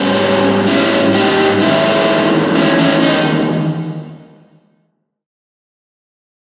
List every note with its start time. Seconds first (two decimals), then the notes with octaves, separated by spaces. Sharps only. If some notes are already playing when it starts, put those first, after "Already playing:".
Already playing: G#2 G3 B3 C#4
0.67 C#4 E4
1.14 D#4 G4
1.61 E2 D#3 G#3 C#4 E4
2.55 C#4 E4
2.78 C#4 E4
3.02 D#4